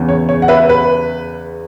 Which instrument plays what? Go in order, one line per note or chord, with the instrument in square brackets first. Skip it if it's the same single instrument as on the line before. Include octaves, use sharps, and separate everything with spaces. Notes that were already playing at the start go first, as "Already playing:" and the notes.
Already playing: [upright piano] E2 C#3 E3
C#5
C#5
F#5
B4 E5
B4